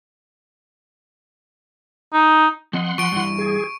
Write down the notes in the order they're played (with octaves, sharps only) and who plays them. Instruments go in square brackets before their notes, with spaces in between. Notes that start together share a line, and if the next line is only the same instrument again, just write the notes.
[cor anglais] D#4
[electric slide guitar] F3 C4 D#5 [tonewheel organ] F#5 C6
[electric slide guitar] F3 [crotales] C#6 D7
[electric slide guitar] G2 E3
[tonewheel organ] G#4